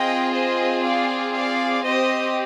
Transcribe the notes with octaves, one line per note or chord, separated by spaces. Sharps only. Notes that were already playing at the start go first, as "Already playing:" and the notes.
Already playing: C4 F4 G#4 D#5 G5
C5 D#5
D5 F5
D5 F5
C4 G4 C5 D#5